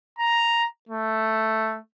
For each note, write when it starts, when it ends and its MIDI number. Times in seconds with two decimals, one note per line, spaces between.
0.19 0.65 82
0.89 1.79 57